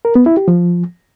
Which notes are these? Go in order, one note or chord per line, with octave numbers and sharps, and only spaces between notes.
A#4
B3
E4
G4
F3